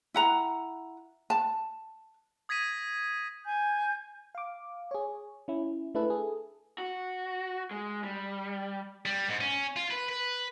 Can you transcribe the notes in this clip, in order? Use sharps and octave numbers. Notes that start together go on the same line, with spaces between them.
E4 F#5 A#5
A5
D#6 G#6 A#6 B6 D#7
G#5 G6
F5 D6
G#4 C#5
C#4 E4
A3 D4 E4 G#4 A4 B4
G#4 A4
F#4
G#3
G3
G3
G#2
C#4
F4
B4
B4